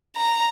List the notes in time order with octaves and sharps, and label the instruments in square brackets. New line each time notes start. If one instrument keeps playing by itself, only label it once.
[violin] A#5